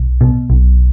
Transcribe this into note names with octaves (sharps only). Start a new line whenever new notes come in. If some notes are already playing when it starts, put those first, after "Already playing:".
Already playing: B1
B2
B1